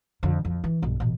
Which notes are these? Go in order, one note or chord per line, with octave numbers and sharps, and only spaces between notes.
F2 D3
F2
E3
B1 G2
A1 B2